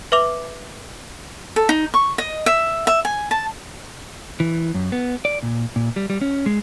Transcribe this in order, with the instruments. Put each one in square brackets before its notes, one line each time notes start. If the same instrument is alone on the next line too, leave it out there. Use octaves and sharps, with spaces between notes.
[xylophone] B4 E5 D6 F7
[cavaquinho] A4
D#4
C#6
D#5
E5
E5
G#5
A5
[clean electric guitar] E3
F#2
B3
D5
A#2
A#2
G3
G3
C#4
G#3